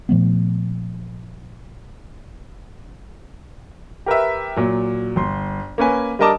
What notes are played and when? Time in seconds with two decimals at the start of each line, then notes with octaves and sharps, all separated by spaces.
0.09 A#2 F3 A3 B3
4.06 G4 A#4 B4 E5
4.56 A#2 F#3
5.16 G1 C6
5.78 A#3 C#4 B4 G#5
6.19 G3 D4 A#4 D#5 A5 D6